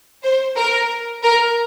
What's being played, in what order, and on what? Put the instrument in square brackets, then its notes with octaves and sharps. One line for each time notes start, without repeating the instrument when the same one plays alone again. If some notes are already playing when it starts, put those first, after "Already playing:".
[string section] C5
A#4
A#4